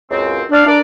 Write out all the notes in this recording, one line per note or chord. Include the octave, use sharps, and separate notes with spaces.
C#2 F#2 C4
D4 D5 F5
D4 A4 A#4 D5